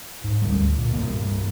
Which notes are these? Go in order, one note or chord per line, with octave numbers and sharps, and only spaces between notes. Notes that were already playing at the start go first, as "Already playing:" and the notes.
G#2
D2 G3
D2
A#2
G2 C3 A#3